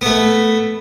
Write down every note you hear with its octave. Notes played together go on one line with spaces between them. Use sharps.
A3 B3